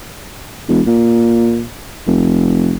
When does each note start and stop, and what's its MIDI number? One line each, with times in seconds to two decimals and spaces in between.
0.69 0.81 28
0.87 1.64 46
2.07 2.76 29